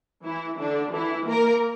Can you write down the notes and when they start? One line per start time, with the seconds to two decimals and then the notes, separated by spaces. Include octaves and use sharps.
0.24 E3 E4
0.59 D3 D4
0.93 E3 E4
1.28 A#3 A#4